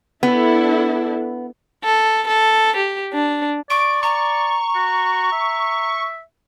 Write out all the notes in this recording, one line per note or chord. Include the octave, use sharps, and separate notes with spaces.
B3 D4 E4 A4
A4
A4
G4
D4
D5 C#6 D7
A#5 C#6
F#4
E5